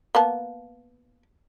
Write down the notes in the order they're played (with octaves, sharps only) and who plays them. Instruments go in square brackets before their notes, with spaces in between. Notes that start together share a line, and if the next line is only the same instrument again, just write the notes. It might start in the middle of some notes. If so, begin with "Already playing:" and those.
[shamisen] A#3 B3 A5